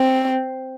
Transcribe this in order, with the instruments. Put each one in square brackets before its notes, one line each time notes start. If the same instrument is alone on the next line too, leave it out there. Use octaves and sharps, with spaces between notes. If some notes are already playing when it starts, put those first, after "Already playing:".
Already playing: [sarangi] C4